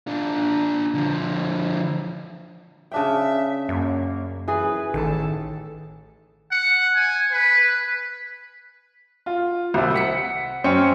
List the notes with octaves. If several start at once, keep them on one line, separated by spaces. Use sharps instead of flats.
D4 F4
D3 F3
C#3 D4 E5 G5
F#2 A#3
E3 G#4 B4
A1 D#3 A4
F#5
G#5
B4
F4
C2 C3
F#5 B6 C#7
F#2 C#4 C5 G5 C#7